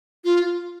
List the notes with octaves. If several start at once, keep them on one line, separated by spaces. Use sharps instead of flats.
F4